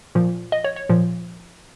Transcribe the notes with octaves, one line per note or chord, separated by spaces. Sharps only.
A#2 F3
D#5
C#5
C#5
A#2 F3